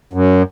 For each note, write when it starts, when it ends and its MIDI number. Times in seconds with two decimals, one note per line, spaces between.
0.13 0.43 42